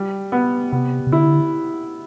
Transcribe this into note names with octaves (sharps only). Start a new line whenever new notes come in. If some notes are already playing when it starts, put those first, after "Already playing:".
Already playing: G3
B3
C3 B3
C3
D3 E4